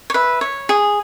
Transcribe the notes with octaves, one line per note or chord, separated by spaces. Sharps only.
C#5
B4 E5
C#5
G#4